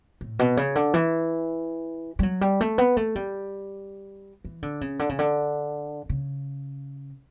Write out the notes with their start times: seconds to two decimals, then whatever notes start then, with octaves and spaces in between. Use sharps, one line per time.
0.21 A2
0.39 B2
0.57 C#3
0.75 D3
0.94 E3
2.19 G3
2.23 F#3
2.41 G3
2.61 A3
2.78 B3
2.97 A3
3.15 G3
4.45 E3
4.62 D3
4.81 C#3
4.99 D3
5.09 C#3
5.19 D3
6.09 C#3